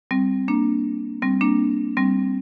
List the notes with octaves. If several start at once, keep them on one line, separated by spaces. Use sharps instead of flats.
G3 C4
A#3 D4
G3 C4
A#3 D4
G3 C4